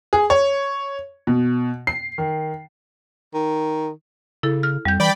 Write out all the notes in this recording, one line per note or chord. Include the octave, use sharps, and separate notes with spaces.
G#4
C#5
B2
C7
D#3
D#3
C#3 E4 A4
F6
F2 G3 G6
E3 D5 G5 B5